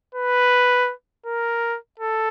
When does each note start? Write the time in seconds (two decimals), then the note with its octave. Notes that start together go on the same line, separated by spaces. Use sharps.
0.15 B4
1.26 A#4
2.00 A4